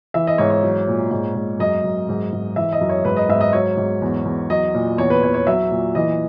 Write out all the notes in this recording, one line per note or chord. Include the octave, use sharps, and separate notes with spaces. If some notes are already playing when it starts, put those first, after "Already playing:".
E3 E5
D#5
G#2 C#5
C#5
F#3
A#2
G#2
G#2
F#2 D#5
F#2
G#2
G#2
E3 E5
D#5
F#2
C#5
G#2 B4
D#5
G#2 E5
D#5
F#3 C#5
G#2
E2
E2
F#3 D#5
A#2
E2 C#5
B4
E2 C#5
C#5
F#3 E5
A#2
E3 D#5